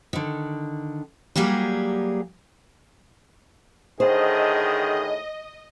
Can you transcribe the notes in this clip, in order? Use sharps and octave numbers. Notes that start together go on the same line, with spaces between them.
D3 D#3
F#3 G3 A#3 G4 G#4
A2 D3 D#3 G#4 C5 D#5